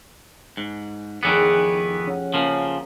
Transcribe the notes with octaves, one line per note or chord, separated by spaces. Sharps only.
G#2
F1 D#3 E3 B3 G#4
C#4 F#5
C#3 F3 A#3 C7